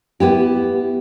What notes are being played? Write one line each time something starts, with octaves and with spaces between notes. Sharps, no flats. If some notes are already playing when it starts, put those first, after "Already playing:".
B3 E4 G4